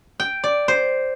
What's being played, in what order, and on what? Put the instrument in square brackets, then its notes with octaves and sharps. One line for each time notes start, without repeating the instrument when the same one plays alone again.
[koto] G5
D5
C5